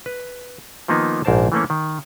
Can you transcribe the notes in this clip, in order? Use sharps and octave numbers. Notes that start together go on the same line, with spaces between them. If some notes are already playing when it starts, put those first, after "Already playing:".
B4
D#3 F3 A#3 B3 D#4
A#1 G#2 A#4 C5 A5
E3 A3 A#3 C#4
D#3